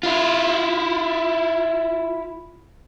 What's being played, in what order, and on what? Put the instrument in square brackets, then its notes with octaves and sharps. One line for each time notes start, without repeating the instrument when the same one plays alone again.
[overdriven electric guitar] E4 F4